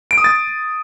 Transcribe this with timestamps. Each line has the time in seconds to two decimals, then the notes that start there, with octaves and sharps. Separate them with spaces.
0.11 D7
0.18 D#6
0.24 A6